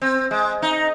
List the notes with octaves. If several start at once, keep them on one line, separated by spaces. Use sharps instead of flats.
C4
G#3
D#4